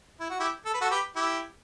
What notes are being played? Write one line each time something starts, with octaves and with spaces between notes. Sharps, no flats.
E4
F#4
E4 G4
A4
B4
F#4 A4
G4 B4
E4 G4